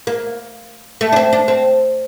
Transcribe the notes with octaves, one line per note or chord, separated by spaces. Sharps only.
A#3
A3
D4
C4
D4
C4